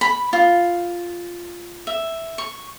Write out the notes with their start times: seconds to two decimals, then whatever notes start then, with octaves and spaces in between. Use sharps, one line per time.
0.01 B5
0.33 F4
1.87 E5
2.38 C#6